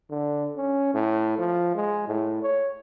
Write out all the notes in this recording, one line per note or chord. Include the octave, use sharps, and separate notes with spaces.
D3
C#4
A2
F3
G#3
A2
C#5